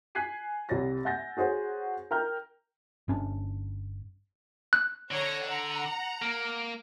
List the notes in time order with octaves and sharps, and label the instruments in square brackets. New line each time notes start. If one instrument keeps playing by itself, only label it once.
[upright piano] G#5 F#6 G#6 B6 C7 D#7
C2 G4 C#5 A6 A#6
E5 F#5 G#5 G6 A6 A#6
F#4 G#4 C5 C#5 F#5
A#4 G5 A#5 F6 G6
[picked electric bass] G1 C#4 D4
[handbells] F#6
[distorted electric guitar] D3 [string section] C#5 A#5
[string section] F#5 A#5
[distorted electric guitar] A#3